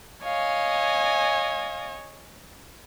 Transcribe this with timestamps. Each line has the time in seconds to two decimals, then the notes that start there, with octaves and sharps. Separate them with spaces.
0.24 C#5 D#5 F5 G#5